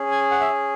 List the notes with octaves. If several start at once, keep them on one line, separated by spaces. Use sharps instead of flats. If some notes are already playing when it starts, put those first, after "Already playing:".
Already playing: C#4 G#4
G#5
F#5
E5